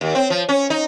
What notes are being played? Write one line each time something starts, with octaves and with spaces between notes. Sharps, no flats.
D#2
C4
F3
C#4
D#4